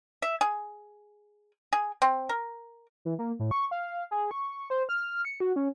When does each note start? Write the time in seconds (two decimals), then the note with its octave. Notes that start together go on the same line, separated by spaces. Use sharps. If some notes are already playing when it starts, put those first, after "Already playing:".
0.22 E5
0.41 G#4
1.73 G#4
2.02 C4
2.29 A#4
3.05 E3
3.19 A#3
3.39 A2
3.51 C#6
3.71 F5
4.11 G#4
4.31 C#6
4.70 C5
4.89 F6
5.25 C#7
5.40 F#4
5.56 C#4